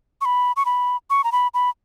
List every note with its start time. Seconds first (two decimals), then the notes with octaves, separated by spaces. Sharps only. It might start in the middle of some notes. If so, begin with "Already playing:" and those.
0.21 C#6
0.25 B5
0.56 C#6
0.66 B5
1.10 C#6
1.24 A#5
1.32 B5
1.54 B5